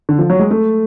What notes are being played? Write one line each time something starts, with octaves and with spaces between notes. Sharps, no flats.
D3
F3
F#3
G#3
A3